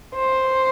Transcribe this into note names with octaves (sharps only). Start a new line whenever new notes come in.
C5